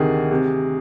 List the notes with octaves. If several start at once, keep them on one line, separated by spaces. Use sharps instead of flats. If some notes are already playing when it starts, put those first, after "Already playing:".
Already playing: D2 C3 D#3 G#4
C3